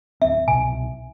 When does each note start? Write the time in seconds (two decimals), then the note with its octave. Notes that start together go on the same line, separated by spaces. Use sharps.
0.22 D1 C4 E5
0.48 C2 B2 G#5